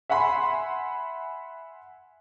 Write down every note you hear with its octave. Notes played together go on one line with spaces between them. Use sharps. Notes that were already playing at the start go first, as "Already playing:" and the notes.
E5 F#5 G#5 B5 C6